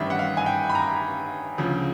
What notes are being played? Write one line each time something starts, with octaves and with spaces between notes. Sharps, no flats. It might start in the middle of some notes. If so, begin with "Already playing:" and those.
Already playing: A1 G2 D#3 E5
F#5
F5
G#5
G5
B5
A#5
D2 C#3 F3